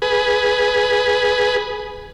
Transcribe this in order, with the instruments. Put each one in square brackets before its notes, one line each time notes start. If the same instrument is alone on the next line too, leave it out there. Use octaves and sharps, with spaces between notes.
[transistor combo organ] G#4 B4